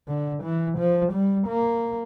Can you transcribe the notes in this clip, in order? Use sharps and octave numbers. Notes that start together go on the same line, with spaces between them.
D3
E3
F3
G3
A#3